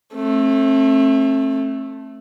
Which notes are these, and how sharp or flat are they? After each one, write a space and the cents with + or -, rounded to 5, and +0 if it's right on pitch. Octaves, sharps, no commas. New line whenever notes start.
A3 +0 C4 +45